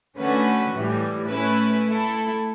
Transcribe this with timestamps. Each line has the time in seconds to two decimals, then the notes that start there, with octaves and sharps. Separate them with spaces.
0.17 D3 A3 C#4 F#4 B4
0.73 A2 E3 G3
1.29 A3 C#4 E4 B4
1.86 A3 E4 A4